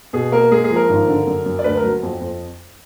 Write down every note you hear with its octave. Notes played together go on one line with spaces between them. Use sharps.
B2 G#4
A#3 A#4
G#3 G#4
G#4
F3
A#4
G#1
D3
F#2
F#2
D5
D2 B4
A#4
F#3
F2
F2